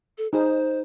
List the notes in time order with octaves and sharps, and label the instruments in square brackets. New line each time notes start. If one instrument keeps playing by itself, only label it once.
[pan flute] A4
[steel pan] D#4 G#4 [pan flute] C5